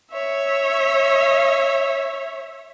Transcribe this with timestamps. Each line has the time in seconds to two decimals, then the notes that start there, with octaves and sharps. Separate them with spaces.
0.12 C#5 E5